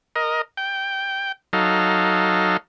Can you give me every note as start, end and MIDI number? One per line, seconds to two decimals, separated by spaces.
0.16 0.42 70
0.16 0.42 75
0.57 1.32 79
1.53 2.57 54
1.53 2.57 63
1.53 2.57 69
1.53 2.57 77